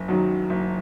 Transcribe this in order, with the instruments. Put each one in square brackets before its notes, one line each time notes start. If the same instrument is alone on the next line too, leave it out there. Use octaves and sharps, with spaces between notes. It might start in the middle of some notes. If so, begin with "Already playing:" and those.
Already playing: [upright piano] F#1
F#2 D#3 F#3
F#1